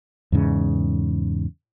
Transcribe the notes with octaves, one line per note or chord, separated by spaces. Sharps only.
E2 G#2 C#3